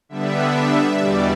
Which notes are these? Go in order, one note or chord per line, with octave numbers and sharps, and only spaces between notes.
D3 G3 B3 D4 E5
E2 B2 G3 D5